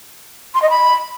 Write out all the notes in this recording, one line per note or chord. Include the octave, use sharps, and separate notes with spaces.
C6
D#5
B5